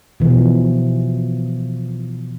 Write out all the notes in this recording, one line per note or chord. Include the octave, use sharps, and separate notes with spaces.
B2 E3 F3